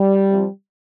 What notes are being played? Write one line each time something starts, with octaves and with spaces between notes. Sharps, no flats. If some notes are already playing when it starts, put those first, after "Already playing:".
Already playing: G3
C3 F3